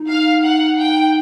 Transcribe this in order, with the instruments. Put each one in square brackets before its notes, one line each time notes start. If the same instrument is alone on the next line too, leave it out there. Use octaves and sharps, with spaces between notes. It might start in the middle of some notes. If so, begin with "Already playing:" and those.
Already playing: [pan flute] D#4
[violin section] F5
F#5
G5